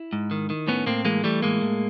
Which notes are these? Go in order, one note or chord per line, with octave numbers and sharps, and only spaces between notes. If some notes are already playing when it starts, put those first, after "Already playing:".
Already playing: E4
G#2
D#3
D#3
A2 B3 C#4
A2 A#3 C4
E3 G#3 A#3
E3 G3 A3
A2 G#3 A#3
A2